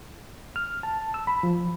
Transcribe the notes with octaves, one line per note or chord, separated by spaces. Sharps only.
F6
A5
E6
B5
F3